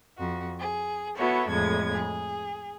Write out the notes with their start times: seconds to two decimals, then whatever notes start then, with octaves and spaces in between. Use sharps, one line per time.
0.20 F2 F#4
0.58 G#4
1.17 B3 E4 F#4 A4 C#5
1.50 F2 A2 G#3 G#6
1.93 G#4